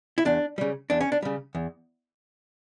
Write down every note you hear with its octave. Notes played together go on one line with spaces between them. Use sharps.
E4
E2 D4
C#3 G3
E2 D4
C#4
D4
C#3 G3
E2